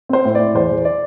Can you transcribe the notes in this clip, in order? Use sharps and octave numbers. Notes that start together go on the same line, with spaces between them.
C4 C5
A2
A2 D5
E2 C5
E2
D5